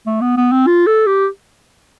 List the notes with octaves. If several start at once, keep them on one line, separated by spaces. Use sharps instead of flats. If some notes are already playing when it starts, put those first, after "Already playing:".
A3
B3
B3
C4
F4
A4
G4